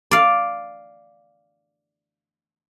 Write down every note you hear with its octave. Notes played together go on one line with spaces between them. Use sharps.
D5 F5